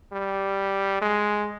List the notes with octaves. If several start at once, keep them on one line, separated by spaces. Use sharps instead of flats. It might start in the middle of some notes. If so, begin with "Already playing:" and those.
G3
G#3